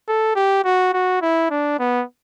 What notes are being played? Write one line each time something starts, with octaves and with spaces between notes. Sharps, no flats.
A4
G4
F#4
F#4
E4
D4
B3